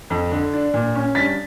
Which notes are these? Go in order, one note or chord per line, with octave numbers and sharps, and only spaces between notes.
F2
D3
D4
A#2
C#4
G2 A6 B6